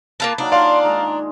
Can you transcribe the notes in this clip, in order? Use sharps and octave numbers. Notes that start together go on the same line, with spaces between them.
A#3 F4 B4 A5
F#3 A#3 D4 D#4
F4 G#4 D5 F5 C6
D#3 G#3 A#5